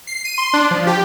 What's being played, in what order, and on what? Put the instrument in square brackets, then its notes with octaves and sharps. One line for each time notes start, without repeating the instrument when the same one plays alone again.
[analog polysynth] C7
D#7
C6
D4
F3
G4